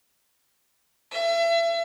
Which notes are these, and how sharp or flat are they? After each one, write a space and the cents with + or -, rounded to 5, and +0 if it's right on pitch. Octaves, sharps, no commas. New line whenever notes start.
E5 +35